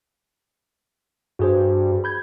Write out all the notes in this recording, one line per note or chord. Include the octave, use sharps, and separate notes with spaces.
G2 F#4 G#4 C5
B5 G6 G#6